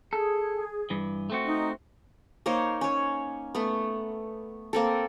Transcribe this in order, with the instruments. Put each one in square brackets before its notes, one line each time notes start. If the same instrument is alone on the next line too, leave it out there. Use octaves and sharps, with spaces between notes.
[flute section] G#4 [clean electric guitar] A4
[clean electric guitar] G2 E3
A3 C4 F#4
[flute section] D#4
[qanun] A#3 D#4 C5 C#5
C#4 C#5
A3 B3
A#3 C4 A4